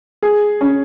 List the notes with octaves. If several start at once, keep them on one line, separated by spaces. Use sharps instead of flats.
G#4
C#4